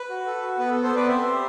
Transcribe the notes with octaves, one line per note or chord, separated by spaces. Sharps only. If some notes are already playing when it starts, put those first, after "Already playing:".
Already playing: B4
F#4
A4
F#4
B3 B4
B3 A4
A4 C5
B3 B4 D5
C4 C5 E5
G4